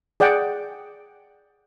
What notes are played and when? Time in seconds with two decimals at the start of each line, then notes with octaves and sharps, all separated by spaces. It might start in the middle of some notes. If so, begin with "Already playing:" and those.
0.20 G#4 D5 F#5 G5